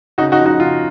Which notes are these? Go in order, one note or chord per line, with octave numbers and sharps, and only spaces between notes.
C#3 D#4 F#4
D#4 F#4
F3
D#4 F#4
C#3 F4